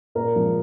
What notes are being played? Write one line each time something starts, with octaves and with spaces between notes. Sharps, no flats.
A#2 A#4
F3 G#3